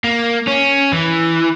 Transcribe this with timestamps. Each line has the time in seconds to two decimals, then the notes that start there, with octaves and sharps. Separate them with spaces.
0.04 A#3
0.47 C#4
0.93 E3